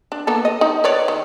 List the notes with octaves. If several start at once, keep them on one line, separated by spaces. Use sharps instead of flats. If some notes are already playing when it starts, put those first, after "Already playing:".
D4
A#3 B3 A4
D#5
D#4
B4 C#5 D5
D#3